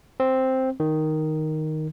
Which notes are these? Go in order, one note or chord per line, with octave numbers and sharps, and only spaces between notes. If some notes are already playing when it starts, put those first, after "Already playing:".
C4
D#3